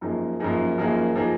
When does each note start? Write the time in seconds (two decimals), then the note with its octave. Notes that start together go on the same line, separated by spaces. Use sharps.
0.01 F#2 F3 A#3 D#4 G#4
0.40 F#2 F3 A#3 D#4 G#4
0.78 F#2 F3 A#3 D#4 G#4
1.16 F3 A#3 D#4 G#4